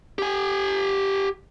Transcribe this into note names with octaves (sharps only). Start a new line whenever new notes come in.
G4 G#5